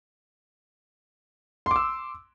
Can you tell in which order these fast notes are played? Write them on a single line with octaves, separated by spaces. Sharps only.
C6 D6 E6